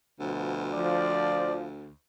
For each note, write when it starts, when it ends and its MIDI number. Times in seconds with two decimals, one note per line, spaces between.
0.20 1.90 38
0.20 0.70 47
0.20 0.70 53
0.73 1.65 53
0.73 1.57 74